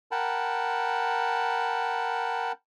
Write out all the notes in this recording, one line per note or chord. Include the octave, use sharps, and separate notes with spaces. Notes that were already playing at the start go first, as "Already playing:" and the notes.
A#4 F#5 G5 A5 B5